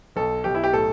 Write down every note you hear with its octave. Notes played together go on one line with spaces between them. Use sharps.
B1 A4
B1 G4
E4
G4
A2 A4